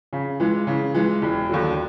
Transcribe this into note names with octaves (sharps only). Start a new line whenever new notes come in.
C#3
E3 G#3
C#3
E3 G#3
E1
D#2 D3 F#3